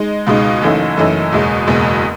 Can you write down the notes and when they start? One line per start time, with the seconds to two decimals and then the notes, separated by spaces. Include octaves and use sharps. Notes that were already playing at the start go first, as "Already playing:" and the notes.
Already playing: G#3 D#4
0.27 C#2 B2 G#3 D#4
0.62 F#1 F#2 E3 A3 D#4
0.97 F#1 F#2 E3 A3 D#4
1.32 F#1 E2 B2 G#3
1.67 F#1 E2 B2 G#3